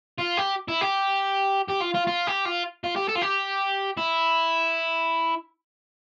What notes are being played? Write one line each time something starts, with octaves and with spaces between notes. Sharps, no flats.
F4
G4
E4
G4
G4
F4
F4
F4
G4
F4
F4
G4
A4
F4
G4
E4